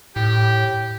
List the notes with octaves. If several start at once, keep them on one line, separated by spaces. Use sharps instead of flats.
A2 G4